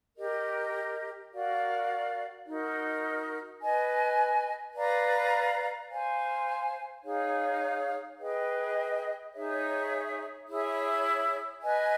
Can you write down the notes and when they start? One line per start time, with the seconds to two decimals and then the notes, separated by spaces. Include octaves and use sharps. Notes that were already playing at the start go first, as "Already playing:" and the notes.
0.17 G4 A#4 D#5
1.32 F#4 A#4 D5 F5
2.47 D#4 F#4 A#4
3.61 B4 D#5 G#5
4.75 B4 D5 F5 A#5
5.89 C5 F5 G#5
7.04 D#4 G#4 C#5 F5
8.18 G#4 B4 D#5 G5
9.33 D#4 G#4 C#5 E5
10.47 E4 G#4 C#5 E5
11.61 B4 D#5 G#5